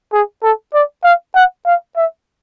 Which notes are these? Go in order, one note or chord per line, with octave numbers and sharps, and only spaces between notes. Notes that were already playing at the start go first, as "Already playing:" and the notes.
G#4
A4
D5
F5
F#5
F5
E5